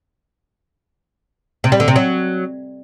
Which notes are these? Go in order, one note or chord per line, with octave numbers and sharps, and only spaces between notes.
C3
G3
D3
C3
F#3